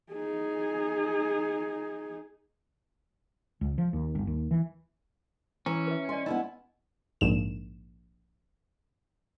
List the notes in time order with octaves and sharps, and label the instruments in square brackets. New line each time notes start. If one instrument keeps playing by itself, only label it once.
[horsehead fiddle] D#4 G#4
[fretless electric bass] C#2
F3
D#2
G1
D#2
E3
[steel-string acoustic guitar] E3 [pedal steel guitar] C#4 [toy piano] A#5
[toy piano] B4 E5
[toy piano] D5 D#5 C6 [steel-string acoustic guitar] G#5
[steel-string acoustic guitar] B3 C#4 E4 [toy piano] D#4 D#5
[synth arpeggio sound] A#1 G#2 E7